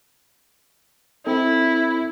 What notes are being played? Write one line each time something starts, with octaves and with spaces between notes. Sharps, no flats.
C4 E4 A4